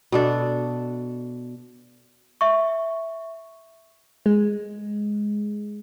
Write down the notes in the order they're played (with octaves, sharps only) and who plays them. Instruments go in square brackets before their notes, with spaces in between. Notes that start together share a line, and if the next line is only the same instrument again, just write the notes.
[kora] B2 D4 A4
[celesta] E5 C#6
[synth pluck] G#3